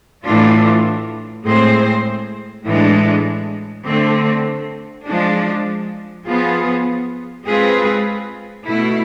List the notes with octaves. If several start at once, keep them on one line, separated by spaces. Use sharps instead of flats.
A2 E3 A3 D4 F4
A2 G#3 C4 G#4 C5
A2 E3 G#3 D4
D3 A3 C4
F3 G#3 D4
F3 B3 F4 G#4
G#3 C4 F4 G#4 B4
B2 A3 E4